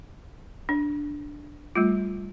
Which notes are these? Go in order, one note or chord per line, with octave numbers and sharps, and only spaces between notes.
D4
G3 A3 F4